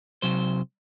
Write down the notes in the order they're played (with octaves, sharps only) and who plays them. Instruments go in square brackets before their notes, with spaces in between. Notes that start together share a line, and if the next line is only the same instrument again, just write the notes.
[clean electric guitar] C3 F#3 C5